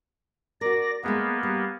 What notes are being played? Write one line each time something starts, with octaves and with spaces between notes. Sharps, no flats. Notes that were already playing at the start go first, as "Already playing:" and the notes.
F#4 A#4 D5 A#6
G#3 A#3 B3 G#4 E5
G3